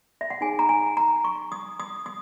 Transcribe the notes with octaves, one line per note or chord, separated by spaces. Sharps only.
E5
F#5
D#4 G#4 C#5 G#5
A#5
G#5
A#5
C#6
D#6
D#6
D#6